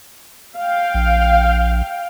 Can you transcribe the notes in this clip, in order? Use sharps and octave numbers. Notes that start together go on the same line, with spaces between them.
F5 G5
A#1